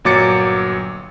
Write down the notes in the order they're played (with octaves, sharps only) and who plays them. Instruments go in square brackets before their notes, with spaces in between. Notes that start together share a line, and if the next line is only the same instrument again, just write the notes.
[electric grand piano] G1 A#2 F#3 D6 A6 C#7